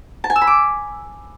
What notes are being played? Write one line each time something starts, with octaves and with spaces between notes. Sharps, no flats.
A5
G#5
E6
B5
D6